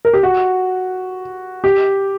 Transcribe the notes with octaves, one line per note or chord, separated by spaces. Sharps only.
A#4
G4
F#4
G4